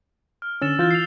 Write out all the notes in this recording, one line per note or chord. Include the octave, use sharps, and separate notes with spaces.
F6
D3 C#4 E6 A6 E7
E3 F4 F6 G6 A6
C7 F7